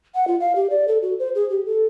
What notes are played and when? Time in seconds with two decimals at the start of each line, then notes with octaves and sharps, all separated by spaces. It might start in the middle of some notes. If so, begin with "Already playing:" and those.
0.15 F#5
0.28 F4
0.40 F5
0.56 G4
0.70 D5
0.88 A4
1.02 F#4
1.19 C5
1.35 G#4
1.50 G4
1.66 A4